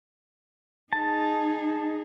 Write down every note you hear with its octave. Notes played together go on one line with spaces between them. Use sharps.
D#4 G#4 A5